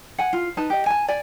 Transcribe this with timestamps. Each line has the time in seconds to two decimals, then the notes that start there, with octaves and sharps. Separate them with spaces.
0.18 F#5 G#5
0.33 F4
0.57 D#4 B4 A5
0.70 G4 D#5
0.86 G#5 A5
1.08 D5 G#5